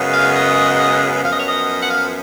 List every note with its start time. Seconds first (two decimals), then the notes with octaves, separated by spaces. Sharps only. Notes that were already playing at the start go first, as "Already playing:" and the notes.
Already playing: F#2 C#3 G#3 B3
0.13 F5
0.35 D#5
1.23 F#2 F3 B3 F5
1.31 D#5
1.39 C#5
1.47 D#5
1.82 F#5
1.89 F5